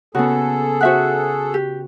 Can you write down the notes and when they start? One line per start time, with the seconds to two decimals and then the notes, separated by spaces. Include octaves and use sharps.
0.15 C#3 B3 F#4 G#4 A4
0.81 F#4 C5 E5 F#5 F#6
1.54 G4